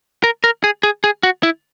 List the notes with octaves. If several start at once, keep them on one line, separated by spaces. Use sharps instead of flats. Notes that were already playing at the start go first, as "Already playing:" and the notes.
A#4
A#4
G#4
G#4
G#4
F#4
E4